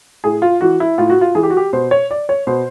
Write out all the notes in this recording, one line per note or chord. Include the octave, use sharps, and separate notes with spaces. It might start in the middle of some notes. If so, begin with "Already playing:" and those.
A2 G#4
F4
E3 F#4
E4
A2 F4
F#4
F4
E3 G#4
G4
F#4
G4
B2 C5
C#5
D5
C#5
B2 C5